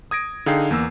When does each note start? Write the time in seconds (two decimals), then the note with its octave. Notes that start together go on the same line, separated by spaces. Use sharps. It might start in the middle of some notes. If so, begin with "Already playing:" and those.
0.11 D#6 G#6 A#6 D7
0.46 D3 D#4 G#4 F5 G5 C7
0.71 E2 A#3 E6